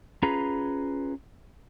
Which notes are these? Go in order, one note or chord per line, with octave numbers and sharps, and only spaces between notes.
C#4 F4 G#4 B4 A#5 B5